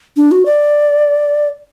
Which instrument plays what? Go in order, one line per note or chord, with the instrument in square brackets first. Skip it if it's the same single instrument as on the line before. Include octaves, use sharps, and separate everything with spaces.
[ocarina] D4
F#4
D5